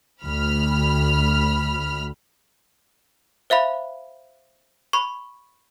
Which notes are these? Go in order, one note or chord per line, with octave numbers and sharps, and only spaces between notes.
D2 B5 F6
C5 E5 F5 B5
B5 C#6